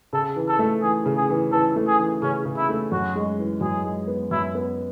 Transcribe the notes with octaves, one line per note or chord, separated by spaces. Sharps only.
C#3 A4
E3
A4
A3
E3 G#4
C#3
G#4
E3
E3 A4
A3
G#4
E3
C#3 C#4
C#3
E4
A3
F#2 F#4
G#3
E3
F#2 G#4
G#3
B3
F#2 E4
B3